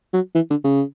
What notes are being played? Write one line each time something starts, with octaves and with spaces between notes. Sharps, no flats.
F#3
E3
D3
C#3